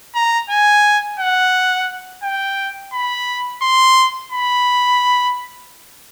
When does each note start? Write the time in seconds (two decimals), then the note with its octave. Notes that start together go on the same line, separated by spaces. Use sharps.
0.15 A#5
0.50 G#5
1.20 F#5
2.24 G5
2.93 B5
3.62 C6
4.32 B5